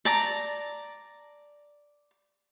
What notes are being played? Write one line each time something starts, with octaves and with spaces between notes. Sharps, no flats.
D5 A5 A#5